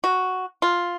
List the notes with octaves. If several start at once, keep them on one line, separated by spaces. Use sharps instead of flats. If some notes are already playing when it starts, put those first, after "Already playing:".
F#4
F4